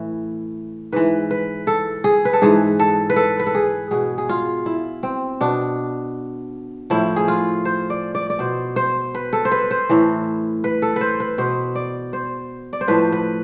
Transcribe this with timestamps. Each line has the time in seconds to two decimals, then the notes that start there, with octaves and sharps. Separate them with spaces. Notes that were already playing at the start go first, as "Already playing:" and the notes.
Already playing: A2 E3
0.93 G#2 E3 B4
1.31 B4
1.67 A4
2.04 G#4
2.25 B4
2.33 A4
2.42 G#2 E3 G#4
2.79 A4
3.10 B4
3.16 A4
3.39 B4
3.47 A4
3.55 G#4
3.91 B2 G#4
4.18 G#4
4.29 F4
4.66 E4
5.03 C4
5.41 B2 D4
6.90 A2 F3 E4
7.16 G#4
7.28 F4
7.65 C5
7.90 D5
8.15 D5
8.30 D5
8.39 B2 C5
8.76 C5
9.15 B4
9.33 A4
9.45 C5
9.52 B4
9.71 C5
9.89 A2 E3
10.64 B4
10.82 A4
10.96 B4 C5
11.20 B4
11.38 B2 C5
11.75 D5
12.13 C5
12.73 D5
12.81 C5
12.88 A2 F3 B4
13.12 B4